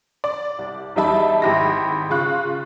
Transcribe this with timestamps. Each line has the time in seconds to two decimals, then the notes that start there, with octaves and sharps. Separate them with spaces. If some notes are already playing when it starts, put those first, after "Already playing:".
0.24 D5
0.59 C2
0.96 E2 G3 D#4 E5 A5 B5
1.42 G#1 E4 G4 B5 A#6
2.10 C#3 F4 C#6 F#6